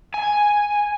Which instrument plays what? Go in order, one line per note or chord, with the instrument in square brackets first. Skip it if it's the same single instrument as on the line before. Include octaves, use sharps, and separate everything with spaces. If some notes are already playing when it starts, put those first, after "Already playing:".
[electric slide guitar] G#5